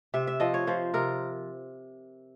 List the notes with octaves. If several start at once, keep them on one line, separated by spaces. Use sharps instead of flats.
C3 E5
E5
F3 D#5
C#5
F3 C5
C3 A#4